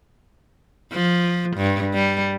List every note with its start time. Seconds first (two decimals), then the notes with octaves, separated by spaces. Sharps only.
0.93 F3
1.57 G2
1.94 G3